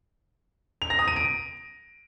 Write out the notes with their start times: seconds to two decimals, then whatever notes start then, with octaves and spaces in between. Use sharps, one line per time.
0.82 F7
0.90 A#6
0.99 D#6
1.08 D#7
1.16 D7